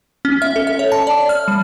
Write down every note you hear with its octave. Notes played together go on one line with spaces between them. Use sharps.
C#4
E5
A4
E5
C#5
A5
D5
F6
G3